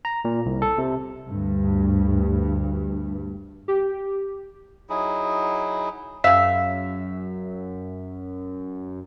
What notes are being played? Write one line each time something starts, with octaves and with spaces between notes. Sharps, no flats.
A#5
A#2
C2
A4
C3
D2 G2
G4
F#3 D#4 E4 G#4
F#2 C#3 E5 F5 B6